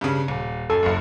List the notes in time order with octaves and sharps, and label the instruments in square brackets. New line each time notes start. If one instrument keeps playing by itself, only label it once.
[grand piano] G2 C#3
D#1
[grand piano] F#2 [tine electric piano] A4
[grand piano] F#1 F#2